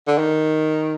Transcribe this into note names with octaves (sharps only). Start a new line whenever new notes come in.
D3
D#3